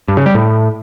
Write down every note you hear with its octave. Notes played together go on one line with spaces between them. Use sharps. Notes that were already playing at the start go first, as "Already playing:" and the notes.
G2
C#3
G3
A2